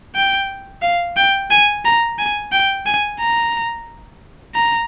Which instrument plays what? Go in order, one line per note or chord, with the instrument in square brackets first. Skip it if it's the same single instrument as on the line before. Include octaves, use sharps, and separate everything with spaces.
[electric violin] G5
F5
G5
G#5
A#5
G#5
G5
G#5
A#5
A#5